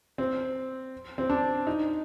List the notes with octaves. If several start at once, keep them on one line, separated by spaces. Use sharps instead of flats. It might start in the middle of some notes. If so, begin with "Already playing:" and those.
C4
C4
D4
D#4